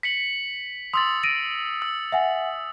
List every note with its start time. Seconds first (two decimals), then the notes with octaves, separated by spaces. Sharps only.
0.03 B6 C#7 F#7
0.94 C6 D#6 E6 A6
1.23 A#6 D7 D#7
1.82 E6
2.12 E5 F#5 G#5